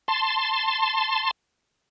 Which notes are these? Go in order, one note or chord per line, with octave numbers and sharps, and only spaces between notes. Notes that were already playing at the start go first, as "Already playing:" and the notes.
A5 C6